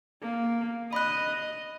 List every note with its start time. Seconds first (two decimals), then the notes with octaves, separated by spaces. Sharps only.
0.22 A#3
0.93 D#5 B5 F#6